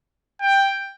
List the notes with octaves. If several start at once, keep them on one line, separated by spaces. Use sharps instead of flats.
G5